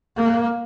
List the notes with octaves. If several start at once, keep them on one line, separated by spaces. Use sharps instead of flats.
A#3